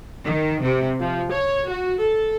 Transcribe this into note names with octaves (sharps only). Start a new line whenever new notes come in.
D#3
C3
F3
C#5
F#4
A4